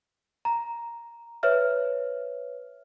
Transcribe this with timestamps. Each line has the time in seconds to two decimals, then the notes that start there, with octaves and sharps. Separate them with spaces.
0.45 A#5
1.43 B4 C#5 E5 F6